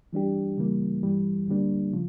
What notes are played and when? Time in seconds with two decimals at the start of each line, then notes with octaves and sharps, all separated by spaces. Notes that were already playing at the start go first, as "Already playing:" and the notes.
0.13 E3 G3 D4 G4
0.58 C#3 E3 G3 A#3
1.03 G2 E3 G3
1.47 D2 D3 G3 A#3 D4
1.93 C#3 F3